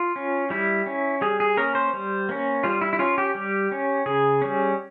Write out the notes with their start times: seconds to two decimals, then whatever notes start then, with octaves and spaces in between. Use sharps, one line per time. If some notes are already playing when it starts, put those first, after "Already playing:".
Already playing: F4
0.16 C#4
0.50 G3 E4
0.86 C#4
1.21 G3 G#4
1.40 G#4
1.57 A#3 C#4 A#4
1.75 C5
1.94 G3
2.29 A#3 C#4
2.64 G3 F4
2.81 E4
2.93 E4
2.99 C#4 F4
3.18 G4
3.35 G3
3.71 C#4
4.06 C#3 G#4
4.42 G3 C#4